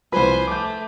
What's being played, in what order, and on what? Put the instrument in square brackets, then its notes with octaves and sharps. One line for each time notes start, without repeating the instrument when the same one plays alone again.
[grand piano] C2 F3 [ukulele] B4 [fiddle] C5 G#5
[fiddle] A3 [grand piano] D6 G6